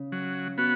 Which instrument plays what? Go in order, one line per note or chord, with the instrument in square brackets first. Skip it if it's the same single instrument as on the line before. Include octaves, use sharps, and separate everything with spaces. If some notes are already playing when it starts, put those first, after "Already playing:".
Already playing: [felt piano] C#3
[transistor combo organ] F#3
B3 F#4